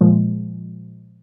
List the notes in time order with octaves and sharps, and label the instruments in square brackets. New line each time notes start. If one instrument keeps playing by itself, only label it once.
[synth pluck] A#2 F3 G#3